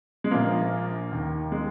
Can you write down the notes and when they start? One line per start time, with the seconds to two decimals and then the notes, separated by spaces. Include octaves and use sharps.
0.24 G#3
0.31 A#1 A#2 F3 A#3
1.12 D#2 D#3
1.52 G#3